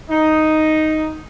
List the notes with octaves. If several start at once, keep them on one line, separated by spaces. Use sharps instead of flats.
D#4